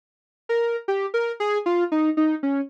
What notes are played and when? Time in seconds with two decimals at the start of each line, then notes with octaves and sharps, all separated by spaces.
0.49 A#4
0.88 G4
1.14 A#4
1.40 G#4
1.66 F4
1.92 D#4
2.17 D#4
2.43 C#4